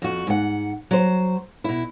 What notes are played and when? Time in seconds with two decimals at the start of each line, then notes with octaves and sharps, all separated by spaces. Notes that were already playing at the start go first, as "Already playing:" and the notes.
0.02 F2 F#4
0.27 G#2 F#5
0.91 F#3 C5
1.64 B2 E4